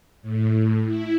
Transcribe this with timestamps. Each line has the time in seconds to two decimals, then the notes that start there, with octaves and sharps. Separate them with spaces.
0.22 A2
0.86 E4